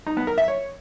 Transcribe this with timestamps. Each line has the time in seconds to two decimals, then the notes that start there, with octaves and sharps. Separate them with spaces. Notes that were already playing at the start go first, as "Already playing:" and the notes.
0.07 D#4
0.17 B3
0.27 A#4
0.38 E5
0.48 C#5